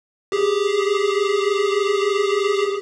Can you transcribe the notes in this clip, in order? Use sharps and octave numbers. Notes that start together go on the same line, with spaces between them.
G4 G#4